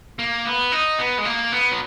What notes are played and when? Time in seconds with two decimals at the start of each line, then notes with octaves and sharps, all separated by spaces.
0.19 A#3
0.45 B3
0.72 D#4
0.99 B3
1.18 G#3
1.25 A#3
1.52 B3
1.72 F#3